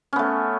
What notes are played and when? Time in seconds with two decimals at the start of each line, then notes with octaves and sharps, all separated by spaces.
0.13 C#4
0.16 B3
0.19 A3